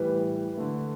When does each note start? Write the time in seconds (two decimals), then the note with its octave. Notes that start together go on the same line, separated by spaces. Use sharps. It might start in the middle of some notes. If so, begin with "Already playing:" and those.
Already playing: A2 E3 G3 B4
0.57 D3 A3